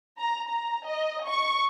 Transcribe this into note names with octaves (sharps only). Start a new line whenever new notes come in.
A#5
A#5
D#5
C#6